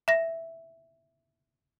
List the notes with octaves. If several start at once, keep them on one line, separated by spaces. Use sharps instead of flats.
E5 A#6